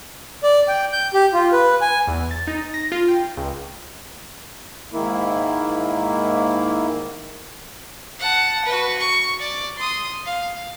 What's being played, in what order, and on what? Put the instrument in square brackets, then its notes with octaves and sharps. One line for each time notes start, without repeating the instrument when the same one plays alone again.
[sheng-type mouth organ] D5
G5
G6
G4
F4
B4
G#5
[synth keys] E2
A6
D#4
A#6
F4
G5
C#2
[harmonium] G#2 D#3 A#3 E4
[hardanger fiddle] F#5 A5
F#4 B4
C#6
D5
C6 D#6
F5